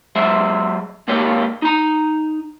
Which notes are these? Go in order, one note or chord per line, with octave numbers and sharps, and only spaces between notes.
F#3 G#3 C5 E5
D#2 G#2 A#3 G4 C#5
D#4 A#5